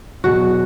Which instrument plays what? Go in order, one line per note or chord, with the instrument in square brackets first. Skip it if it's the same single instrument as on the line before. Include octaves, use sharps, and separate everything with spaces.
[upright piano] E2 B2 F#3 [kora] F#4